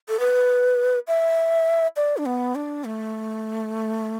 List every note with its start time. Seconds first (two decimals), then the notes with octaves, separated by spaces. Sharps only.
0.09 A4
0.20 B4
1.08 E5
1.96 D5
2.17 D4
2.26 B3
2.55 D4
2.84 A3